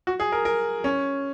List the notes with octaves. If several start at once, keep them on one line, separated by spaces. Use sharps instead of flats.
F#4
G#4
A#4
A#4
C#4